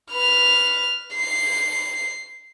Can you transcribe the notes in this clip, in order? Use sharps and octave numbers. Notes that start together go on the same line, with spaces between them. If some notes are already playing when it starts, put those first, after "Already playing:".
B4 F6
C7